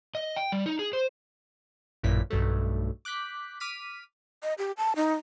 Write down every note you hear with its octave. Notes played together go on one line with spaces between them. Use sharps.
D#5
G5
G3
D#4
G#4
C5
A1 F#2 A#2 E4 B6
B1 G2 F#3 A3
D6 F#6 G6 B6
D6 F6 B6 D#7
D#5
G4
A5
D#4